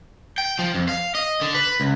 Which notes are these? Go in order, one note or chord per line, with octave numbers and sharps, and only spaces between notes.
G5
F3
F2
F5
D#5
D3
B4
C#2